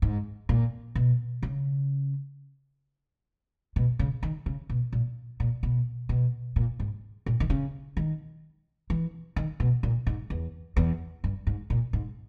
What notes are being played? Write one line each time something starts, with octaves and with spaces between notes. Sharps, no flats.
G#2
A#2
B2
C#3
B2
C#3
D#3
C#3
B2
A#2
A#2
B2
B2
A#2
G#2
A#2
D#3
C#3
D#3
E3
D#3
B2
A#2
G#2
E2
E2
G2
G#2
A#2
G#2